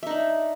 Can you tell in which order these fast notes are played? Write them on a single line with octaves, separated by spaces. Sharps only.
E5 D#4 D4